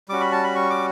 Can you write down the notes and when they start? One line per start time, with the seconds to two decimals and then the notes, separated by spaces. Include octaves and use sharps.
0.09 G3 C#4 F#4 D6
0.21 B5
0.32 A5
0.43 B5
0.55 C#6
0.70 D6